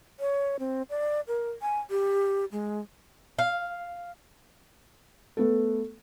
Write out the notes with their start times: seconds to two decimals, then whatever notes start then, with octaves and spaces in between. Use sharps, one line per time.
0.20 C#5
0.59 C4
0.90 D5
1.27 A#4
1.62 G#5
1.90 G4
2.52 G#3
3.39 F5
5.37 A3 B3 A4